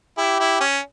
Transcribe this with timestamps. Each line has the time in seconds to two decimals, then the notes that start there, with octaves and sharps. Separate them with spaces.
0.18 E4 G4
0.40 E4
0.60 C#4